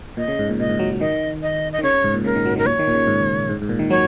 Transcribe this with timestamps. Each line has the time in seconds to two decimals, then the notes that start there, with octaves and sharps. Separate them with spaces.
0.17 A#2 D#5
0.28 C#3
0.39 G#2
0.49 A#2
0.60 A#2 D#5
0.69 G#2
0.79 F#3
0.90 F#3
1.01 D#3 D#5
1.42 D#5
1.72 D#5
1.79 D#3
1.83 C#3 C#5
1.94 C#3
2.04 G#2
2.14 A#2
2.24 C#3 A#4
2.36 D#3
2.46 F#3
2.56 D#3 A#4
2.66 A#2 C#5
2.79 D#3
2.88 A#2
2.94 C#3
3.07 G#2
3.49 G#2
3.62 G#2
3.69 A#2
3.79 D#3
3.90 F#3 C#5